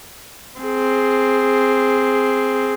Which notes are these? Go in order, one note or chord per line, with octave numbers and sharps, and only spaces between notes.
C4 G#4